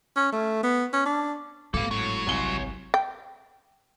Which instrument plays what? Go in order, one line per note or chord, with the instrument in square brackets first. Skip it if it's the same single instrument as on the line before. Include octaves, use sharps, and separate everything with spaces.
[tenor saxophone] C#4
A3
B3
C#4
D4
[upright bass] G#1 [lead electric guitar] A#3 F5 [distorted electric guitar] A4 B4
[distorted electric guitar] A2 [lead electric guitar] F#3
[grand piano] C2 G#5 G7 [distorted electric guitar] C#5 C6
[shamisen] G5